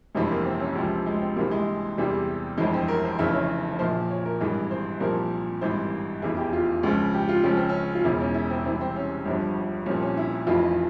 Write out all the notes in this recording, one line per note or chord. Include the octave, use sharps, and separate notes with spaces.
G1 F2 C3 E3 G#3
A#3
C4
C#4
C#2 C3 F3 C4
G#3
C4
C2 C3 E3 A#3
G#3
E2 C3 E3 G3
G1 F2 E3 G#3
C4
A#4
C5
F1 F2 C#3 E3 E5
C#5
A#1 A#2 F3 C5
C#5
A#4
G#1 G2 E3 G#4
C5
C2 A#2 F3 A#4
G#1 G2 E3 C5
F1 E2 E3 G#4
G4
F4
C#2 C#3 F3
G4
F4
C#2 C#3 F3 C#4
C4
C#4
F4
E1 E2 E3 E4
C#4
E4
C4
C2 C3 E3 C4
C4
C#4
G1 G2 F3
C2 A#2 F3 C#4
C#4
E4
F1 F2 E3 F4